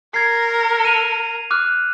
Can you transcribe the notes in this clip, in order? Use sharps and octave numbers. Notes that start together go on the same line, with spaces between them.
A#4 G#6 C7
D#7 F7
D6 F6 F#6